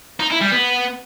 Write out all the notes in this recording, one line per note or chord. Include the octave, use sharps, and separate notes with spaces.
D#4
E4
G3
B3